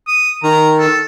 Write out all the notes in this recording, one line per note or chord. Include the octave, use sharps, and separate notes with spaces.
D#6
D#3 A#5
A4